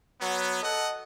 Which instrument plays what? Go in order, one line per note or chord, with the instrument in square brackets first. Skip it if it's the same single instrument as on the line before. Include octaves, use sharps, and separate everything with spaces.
[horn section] F#3 B3
A4 D#5 F#5